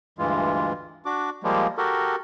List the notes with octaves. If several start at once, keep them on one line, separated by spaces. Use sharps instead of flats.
D2 G2 E3 G#3 F4
D4 F#4 D6
F3 G3 G#3 A#3
F#4 G4 A4 A#4